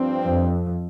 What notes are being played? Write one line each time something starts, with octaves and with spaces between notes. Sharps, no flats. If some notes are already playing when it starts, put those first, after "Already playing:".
Already playing: G2 F3 C4
F2